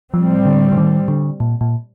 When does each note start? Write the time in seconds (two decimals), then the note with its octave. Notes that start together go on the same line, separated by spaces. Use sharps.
0.13 A2 F3 G3 C4
0.46 D3
0.72 D3
0.77 D#3
1.08 D3
1.40 A#2
1.61 A#2